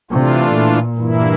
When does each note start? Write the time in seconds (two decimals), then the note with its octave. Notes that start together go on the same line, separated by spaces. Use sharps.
0.10 C3 E3 A3 D4 F4
0.53 A#2
0.96 G2 E3 A#3 E4